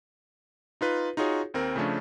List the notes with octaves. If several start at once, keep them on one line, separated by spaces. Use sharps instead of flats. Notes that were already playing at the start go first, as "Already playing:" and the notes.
D#4 F4 B4
D#4 F4 F#4 G#4 C#5
D#2 C4 A#4
C#3 F3 A3 C#4 D4